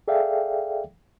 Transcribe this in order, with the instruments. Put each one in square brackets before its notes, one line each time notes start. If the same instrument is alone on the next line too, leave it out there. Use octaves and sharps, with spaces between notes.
[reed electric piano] G#4 A4 D5 E5 F5 G5